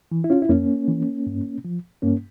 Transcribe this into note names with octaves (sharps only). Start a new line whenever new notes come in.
E3
E4
C#4 F4
E4
F2 A#3 C#4
E3
G2
F3
G2 A#3 C#4